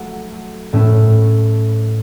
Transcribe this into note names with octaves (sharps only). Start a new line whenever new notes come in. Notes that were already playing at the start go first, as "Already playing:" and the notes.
Already playing: F#3 A3 F#4 A4
A2 A3 C#4